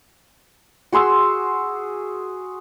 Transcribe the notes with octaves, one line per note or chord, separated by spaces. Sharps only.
F#4 G#4 C6 E6